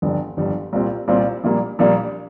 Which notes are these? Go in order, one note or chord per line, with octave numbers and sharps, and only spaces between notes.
G1 F2 D3 G3
G1 F2 D3 G3
C2 A#2 G3 C4 F4
C2 A#2 G3 C4 F4
A#1 A#2 G3 A#3
A#1 A#2 G3 A#3